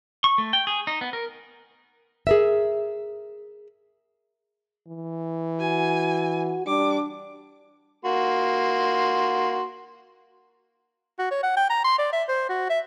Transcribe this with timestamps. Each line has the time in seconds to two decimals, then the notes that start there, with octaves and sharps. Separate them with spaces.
0.24 C#6
0.38 A3
0.53 G5
0.67 G#4
0.87 D#4
1.01 B3
1.13 A#4
2.27 G#4 A#4 E5
4.88 E3
5.60 F#4 G#5
6.66 G3 D4 D6
8.05 A#3 F#4 C6
11.19 F#4
11.31 C#5
11.43 F#5
11.57 G5
11.70 A#5
11.84 C6
11.99 D5
12.13 E5
12.29 C5
12.49 F#4
12.70 E5